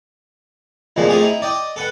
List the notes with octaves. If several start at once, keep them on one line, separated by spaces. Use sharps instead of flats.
C2 F2 A#2 F3 G#3
A3 C4 F4 G4 G#4
D#4 E4
D5 D#5 G5
A4 B4 F#5